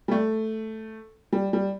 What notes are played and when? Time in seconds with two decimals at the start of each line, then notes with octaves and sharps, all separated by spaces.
0.08 G3
0.11 A3
1.33 G3
1.53 G3